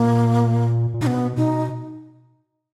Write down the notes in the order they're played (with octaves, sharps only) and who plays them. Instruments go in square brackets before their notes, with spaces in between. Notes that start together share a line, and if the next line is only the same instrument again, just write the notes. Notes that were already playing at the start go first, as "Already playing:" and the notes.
Already playing: [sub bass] A#2 [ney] A#3
[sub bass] A#2
[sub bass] B2 [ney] D#4
[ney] B3
[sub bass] B2 [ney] D#4